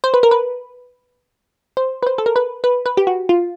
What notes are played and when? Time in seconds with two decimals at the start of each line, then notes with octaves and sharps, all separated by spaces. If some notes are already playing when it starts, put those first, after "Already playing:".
0.04 C5
0.14 B4
0.23 A#4
0.31 B4
1.77 C5
2.03 B4
2.07 C5
2.18 A4
2.26 A#4
2.36 B4
2.64 B4
2.86 B4
2.97 G4
3.07 F#4
3.29 F4